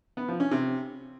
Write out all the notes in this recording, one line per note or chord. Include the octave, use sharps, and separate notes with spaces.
B3
F3
C#4
C3